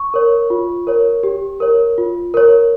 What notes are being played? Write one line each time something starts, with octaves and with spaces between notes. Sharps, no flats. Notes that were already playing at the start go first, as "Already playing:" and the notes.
Already playing: C#6
A#4 C#5
F4
A#4 C#5
G4
A#4 C#5
F4
A#4 C#5